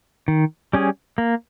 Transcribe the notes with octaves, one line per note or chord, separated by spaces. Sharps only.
D#3
G3 C#4 G#4
A#3